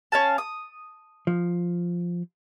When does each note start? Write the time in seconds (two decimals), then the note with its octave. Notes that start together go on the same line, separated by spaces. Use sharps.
0.12 C#4 F5 A5
0.38 D#6
1.27 F3